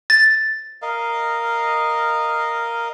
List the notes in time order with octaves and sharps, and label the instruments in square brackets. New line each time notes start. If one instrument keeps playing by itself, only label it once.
[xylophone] A6
[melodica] A#4 D#5 F5